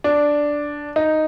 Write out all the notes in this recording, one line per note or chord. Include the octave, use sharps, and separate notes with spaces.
D4
D#4